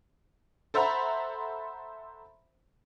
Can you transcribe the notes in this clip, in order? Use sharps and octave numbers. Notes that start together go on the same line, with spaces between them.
A4 C5 E5 F#5 A#5 B5